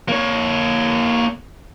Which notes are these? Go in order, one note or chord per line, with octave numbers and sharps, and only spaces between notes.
A#3 C#5